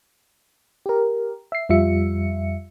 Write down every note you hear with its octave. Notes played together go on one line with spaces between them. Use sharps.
G4 A#4
E5 C7
F2 G3 F4 E5 C#7